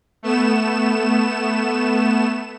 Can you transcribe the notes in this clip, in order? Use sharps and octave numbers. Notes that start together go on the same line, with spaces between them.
A3 B3 E7